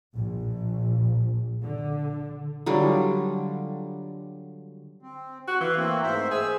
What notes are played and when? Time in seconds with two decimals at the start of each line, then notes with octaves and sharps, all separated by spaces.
0.15 A#1
1.64 D3
2.66 D3 F#3 G3 F4
5.03 C4
5.48 F#4
5.60 E3 F5
5.77 A3 A#3 C4
6.03 G#2 C5 E5
6.31 G#4 E6